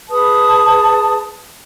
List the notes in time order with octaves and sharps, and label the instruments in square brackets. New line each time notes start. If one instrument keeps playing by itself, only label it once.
[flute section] G#4 B4 A5 D#6